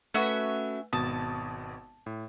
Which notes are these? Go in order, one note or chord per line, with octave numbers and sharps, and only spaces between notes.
A3 C#4 F#4 B4 E5
G#1 B2 A5 D#6
A2